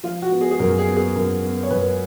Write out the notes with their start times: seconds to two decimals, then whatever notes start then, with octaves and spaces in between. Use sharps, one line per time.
0.04 F3 F4
0.22 F#4
0.32 B3
0.41 G#4
0.51 G#4
0.59 F#2 A#4
0.78 G#4
0.88 B3
0.97 G#4
1.15 F#2 A#4
1.43 B3
1.63 C#5
1.70 F#2 B4